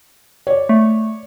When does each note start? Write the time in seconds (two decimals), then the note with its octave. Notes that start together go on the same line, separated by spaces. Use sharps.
0.47 C#5 D5
0.69 A3